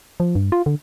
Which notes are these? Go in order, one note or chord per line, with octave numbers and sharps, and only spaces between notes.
F3
G2
F4
D3